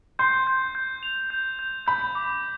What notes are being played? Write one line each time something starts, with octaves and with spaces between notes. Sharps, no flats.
C6 G6
G6
G6
F7
G6
G6
B5 G6
D6